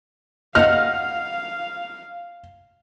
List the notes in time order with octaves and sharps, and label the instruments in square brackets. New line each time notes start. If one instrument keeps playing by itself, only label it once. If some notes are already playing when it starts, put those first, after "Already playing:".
[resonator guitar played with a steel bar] D#5 F#5 [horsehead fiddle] F5 [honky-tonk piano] F6